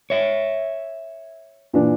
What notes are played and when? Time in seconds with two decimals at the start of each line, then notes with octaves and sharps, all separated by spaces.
0.10 C#5 E5
1.73 A#2 E3 D4